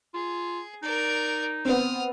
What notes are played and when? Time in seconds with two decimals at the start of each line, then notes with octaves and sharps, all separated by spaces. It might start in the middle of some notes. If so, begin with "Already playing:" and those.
0.14 F4 G#4
0.83 D#4 A#4 D5
1.65 B3 C4 D#6 F6